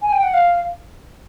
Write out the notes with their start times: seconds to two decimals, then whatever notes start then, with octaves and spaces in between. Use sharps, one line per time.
0.02 G#5
0.12 G5
0.23 F#5
0.34 F5